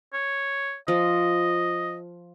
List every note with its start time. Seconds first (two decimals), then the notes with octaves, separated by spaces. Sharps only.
0.13 C#5
0.88 F3 D#5